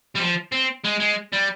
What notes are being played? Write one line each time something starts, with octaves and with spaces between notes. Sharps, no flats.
G3
F3
C4
G#3
G#3
G3